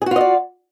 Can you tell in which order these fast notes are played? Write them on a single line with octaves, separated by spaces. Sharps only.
G#4 F#4 F4 D#5 D5